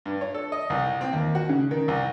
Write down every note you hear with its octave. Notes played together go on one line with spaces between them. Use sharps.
G2
C#5
A4
D#5
C2
C4
D#2
F#4
C#3
D#3
C2